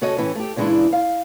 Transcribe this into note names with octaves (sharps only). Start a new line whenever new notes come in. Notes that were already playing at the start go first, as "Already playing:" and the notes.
C#3 F#4 A4 C#5 D#5
A2 E3 C#4
A3 G4
A#2 C#3 E3 G#3 D4 E4
F5